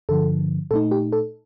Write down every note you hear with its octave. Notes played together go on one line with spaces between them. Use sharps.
G2 D3 F3 A4
A#2 A3 D#4 A4
G4
A4